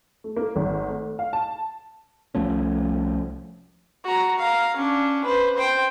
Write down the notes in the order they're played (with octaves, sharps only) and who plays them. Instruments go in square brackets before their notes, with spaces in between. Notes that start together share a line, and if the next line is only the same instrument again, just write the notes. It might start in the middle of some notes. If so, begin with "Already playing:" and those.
[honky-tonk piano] A3
A#3
G#1
A3
F5
A5
[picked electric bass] C2 F3 A3 C#4
[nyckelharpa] F#4 A#5
F5 A#5
C#4 D4
B4 C5
C5 G5